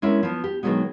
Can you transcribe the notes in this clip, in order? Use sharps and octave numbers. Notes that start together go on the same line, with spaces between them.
G#3 B3 C#4 E4 A#4
F3 B3
G4
B2 D#3 F3 F#3 G#3 B3